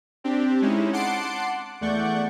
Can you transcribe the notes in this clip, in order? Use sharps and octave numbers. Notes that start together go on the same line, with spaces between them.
C4 D4 G4
G#3 C#4 D#4 E4
F#5 A5 C6 D6 C7 D7
E2 A3 D5 F#5 C#6 G6